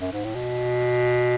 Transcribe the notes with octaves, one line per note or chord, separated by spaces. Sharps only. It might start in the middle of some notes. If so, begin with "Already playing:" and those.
F#2
G#2
A2
B2